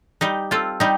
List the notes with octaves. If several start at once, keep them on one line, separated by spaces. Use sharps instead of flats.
G3 D#4 G4
C4 F4 A4
G3 D#4 G4